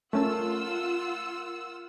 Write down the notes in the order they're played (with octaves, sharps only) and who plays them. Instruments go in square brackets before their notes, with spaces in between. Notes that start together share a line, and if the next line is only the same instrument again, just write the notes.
[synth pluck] A3 C#4 A5 [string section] F4 F#5 E6 [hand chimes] A#4